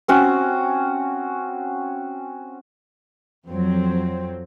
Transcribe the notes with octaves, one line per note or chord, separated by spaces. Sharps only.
C4 C#4 F#4
F2 F#3 C4